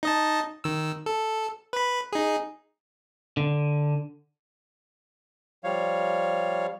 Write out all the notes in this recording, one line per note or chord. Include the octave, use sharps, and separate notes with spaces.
D#4 D#5 A5
D#3 E6
A4
B4 B5
D#4 G#4
D3
F3 G3 C#5 F5